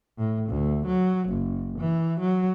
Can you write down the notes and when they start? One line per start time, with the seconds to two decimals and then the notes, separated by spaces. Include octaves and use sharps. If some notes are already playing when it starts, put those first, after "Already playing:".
0.18 A2
0.49 D2
0.86 F#3
1.29 F#1
1.79 E3
2.20 F#3